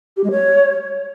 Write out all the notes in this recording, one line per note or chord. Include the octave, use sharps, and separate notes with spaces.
G4
G#3
C#5